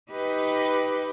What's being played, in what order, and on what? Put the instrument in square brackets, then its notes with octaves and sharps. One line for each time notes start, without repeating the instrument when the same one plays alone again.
[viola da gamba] D#4 G4 B4